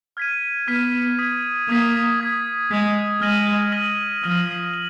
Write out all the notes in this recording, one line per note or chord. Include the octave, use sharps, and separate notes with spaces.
F6 G#6 B6 D#7
B3 F6 G#6 B6 D#7
D#6 G#6 B6
A#3 D#6 G#6 B6
D#6 G#6 B6
G#3 D#6 G#6 B6
G#3 F6 A#6 D#7 F#7
F6 A#6 D#7 F#7
F3 F6 A#6 D#7 F#7
F#7